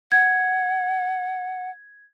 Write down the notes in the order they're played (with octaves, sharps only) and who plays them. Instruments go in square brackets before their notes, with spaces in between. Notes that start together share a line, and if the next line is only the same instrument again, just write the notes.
[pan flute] F#5 [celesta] G#6